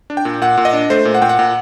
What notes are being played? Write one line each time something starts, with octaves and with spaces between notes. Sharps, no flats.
D4
G5
A#2
A#2 F#5
A#2
D#5
D4
A3 C5
A#2
F#5
A#2 G5
F#5
A#2